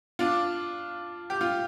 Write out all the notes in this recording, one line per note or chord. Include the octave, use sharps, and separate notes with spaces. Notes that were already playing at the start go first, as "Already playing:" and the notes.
D4 F4
G4
F4